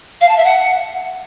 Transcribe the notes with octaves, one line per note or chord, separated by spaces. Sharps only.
F5
A5
E5
F#5